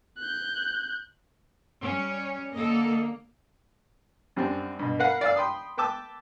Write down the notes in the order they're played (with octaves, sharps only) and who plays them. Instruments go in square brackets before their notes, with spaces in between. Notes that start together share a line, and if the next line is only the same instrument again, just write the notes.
[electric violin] F#6 G6
[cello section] G3 C#4
[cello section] D3 A4 D#5 [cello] A#3
[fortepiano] F#2 G3 C4 D4
G2 B2
A#4 B4 F5 F#5 B5
D5 F5 E6
G5 B5 C6 D#6
B4 G5 A5 D6 E6